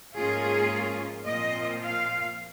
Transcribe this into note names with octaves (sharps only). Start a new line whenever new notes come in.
G#2 F3 A#3 C#4 F4 G#4
A#2 F3 C4 F4 D#5
F5